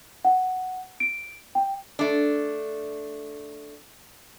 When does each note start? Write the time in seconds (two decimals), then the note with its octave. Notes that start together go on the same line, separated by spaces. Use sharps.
0.25 F#5
1.00 D7
1.55 G5
1.99 A3 D4